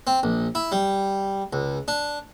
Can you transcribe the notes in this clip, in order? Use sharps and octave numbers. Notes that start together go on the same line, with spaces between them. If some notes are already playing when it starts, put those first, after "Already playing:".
C4
A#1
E4
G3
C#2
D4